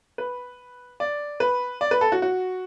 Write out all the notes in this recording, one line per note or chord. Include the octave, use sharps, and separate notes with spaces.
B4
D5
B4
D5
B4
A4
F#4
F#4